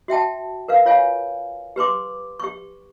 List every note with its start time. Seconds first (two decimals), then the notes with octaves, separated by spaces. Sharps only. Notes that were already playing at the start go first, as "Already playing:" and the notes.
0.08 F#4 E5 G5 A5
0.68 A#4 B4 F5
0.85 F4 C#5 F5 G#5
1.76 G4 B4 C6 D6
2.40 G4 C#6